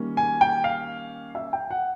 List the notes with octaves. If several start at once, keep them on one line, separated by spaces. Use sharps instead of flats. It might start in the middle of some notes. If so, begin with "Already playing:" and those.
Already playing: D#3 G3 A#3 C#4
G#5
G5
F5
E5
G5
F#5